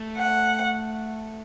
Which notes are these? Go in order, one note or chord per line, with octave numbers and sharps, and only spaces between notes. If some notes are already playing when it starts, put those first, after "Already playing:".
Already playing: A3
F#5